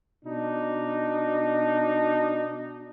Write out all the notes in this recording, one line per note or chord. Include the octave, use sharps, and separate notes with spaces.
B2 D4 D#4